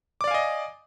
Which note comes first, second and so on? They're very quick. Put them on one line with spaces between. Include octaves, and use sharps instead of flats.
D6 D5 F5 G#5 D#5